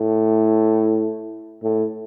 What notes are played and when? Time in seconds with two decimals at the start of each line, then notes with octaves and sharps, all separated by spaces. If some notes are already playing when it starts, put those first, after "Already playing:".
Already playing: A2
1.63 A2